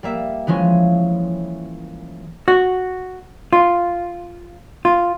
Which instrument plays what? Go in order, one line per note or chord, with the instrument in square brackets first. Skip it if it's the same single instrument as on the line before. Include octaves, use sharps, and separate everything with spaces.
[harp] G3 A#3 E5
E3 F3 G#3 C#4
[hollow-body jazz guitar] F#4
F4
F4